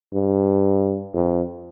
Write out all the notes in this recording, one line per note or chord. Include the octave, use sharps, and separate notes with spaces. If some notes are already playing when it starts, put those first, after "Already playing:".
G2
F2